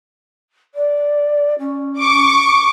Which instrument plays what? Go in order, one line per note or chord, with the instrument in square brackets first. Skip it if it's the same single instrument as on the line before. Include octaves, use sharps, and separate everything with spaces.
[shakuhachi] D5
C#4
[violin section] C#6 D6